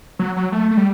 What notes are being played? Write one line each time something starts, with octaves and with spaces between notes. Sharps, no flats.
F#3
F#3
A3
A3
G3